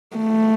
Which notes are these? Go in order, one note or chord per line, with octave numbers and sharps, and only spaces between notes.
A3